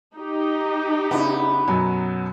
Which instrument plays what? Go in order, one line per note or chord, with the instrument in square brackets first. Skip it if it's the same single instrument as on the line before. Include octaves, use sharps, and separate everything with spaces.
[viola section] D#4 G4
[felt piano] C#3 D4 E4 [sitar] B3
[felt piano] F#2 B2 F#3